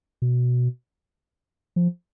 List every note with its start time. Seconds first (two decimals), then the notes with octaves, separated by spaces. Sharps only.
0.22 B2
1.76 F3